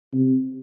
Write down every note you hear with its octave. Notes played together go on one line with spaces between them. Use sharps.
C3